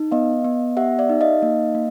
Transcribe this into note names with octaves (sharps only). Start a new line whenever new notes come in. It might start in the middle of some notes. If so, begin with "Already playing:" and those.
Already playing: D#4
B3 D#5 F5
B3
G4 E5 F#5
D5 E5
D#4
D#5 F5
A#3
A#3